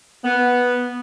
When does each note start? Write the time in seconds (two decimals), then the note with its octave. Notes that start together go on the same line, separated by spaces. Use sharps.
0.24 B3